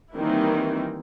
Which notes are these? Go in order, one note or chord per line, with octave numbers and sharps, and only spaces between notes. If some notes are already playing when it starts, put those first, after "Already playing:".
D#3 E3 G3 A#3 C4 E4